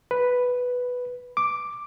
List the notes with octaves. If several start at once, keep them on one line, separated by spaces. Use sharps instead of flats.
B4
D6